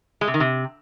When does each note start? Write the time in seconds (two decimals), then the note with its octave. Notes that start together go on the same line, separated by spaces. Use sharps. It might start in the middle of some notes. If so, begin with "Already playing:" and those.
0.21 G#3
0.28 C3
0.34 D#3
0.40 C3